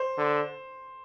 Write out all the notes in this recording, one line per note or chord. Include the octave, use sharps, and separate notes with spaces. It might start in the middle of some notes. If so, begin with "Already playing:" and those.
Already playing: C5
D3